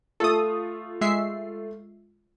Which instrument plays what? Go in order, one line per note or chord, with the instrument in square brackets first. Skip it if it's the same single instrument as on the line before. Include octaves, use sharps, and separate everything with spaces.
[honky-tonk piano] A3 F4 [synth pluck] A4 D#6
[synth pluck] G#3 E5 C7